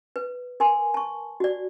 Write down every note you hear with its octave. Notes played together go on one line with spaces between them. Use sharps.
B4
A#4 G#5 C6
A5 C#6
F#4 D5